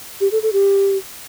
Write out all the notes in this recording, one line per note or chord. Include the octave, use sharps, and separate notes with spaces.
G4
A4
A4
G4